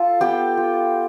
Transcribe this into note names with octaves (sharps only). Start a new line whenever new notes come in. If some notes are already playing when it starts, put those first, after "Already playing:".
Already playing: F4 A4 F5 A5
B3 G4 G5
F4